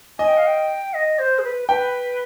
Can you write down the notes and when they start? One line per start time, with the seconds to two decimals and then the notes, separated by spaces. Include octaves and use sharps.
0.19 D#5 G#5
0.28 G5
0.37 F5
0.47 G5
0.94 D#5
1.19 C5
1.39 G#4
1.43 B4
1.69 B4 G5